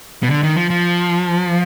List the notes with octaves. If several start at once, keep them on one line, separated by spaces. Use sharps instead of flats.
B2
D3
D#3
F3
F3